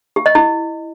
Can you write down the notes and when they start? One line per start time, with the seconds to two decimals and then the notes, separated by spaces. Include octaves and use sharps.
0.16 G4
0.26 D#5
0.35 E4